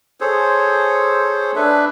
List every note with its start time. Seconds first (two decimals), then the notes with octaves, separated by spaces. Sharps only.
0.20 G#4 A4 C5 C#5
1.56 D4 B4 E5